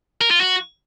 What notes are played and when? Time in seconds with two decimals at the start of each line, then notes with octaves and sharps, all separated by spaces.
0.21 A#4
0.31 F4
0.40 F#4